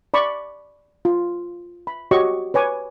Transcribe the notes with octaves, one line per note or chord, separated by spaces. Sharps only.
D5 B5 C#6 D6
F4
B5
F#4 G4 C#5 D#5 C#6
B4 C#5 G#5 D6